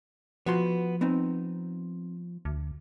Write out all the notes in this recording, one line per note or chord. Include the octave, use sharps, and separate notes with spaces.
F3 B3 F#4 C6
B3 C4 D#4
D2